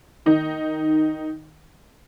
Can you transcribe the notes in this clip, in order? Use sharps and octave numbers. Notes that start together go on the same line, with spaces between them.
D#3 D#4